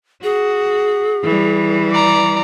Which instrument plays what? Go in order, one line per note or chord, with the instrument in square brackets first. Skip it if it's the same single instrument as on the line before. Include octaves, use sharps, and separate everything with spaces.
[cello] F#4 [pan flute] G#4
[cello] E3 G3
[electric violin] D5 A#5